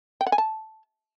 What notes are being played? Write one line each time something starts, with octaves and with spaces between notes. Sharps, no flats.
G5
F#5
G#5
A5